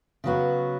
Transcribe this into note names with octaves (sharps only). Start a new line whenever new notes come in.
C#3 F#3 B3 F#4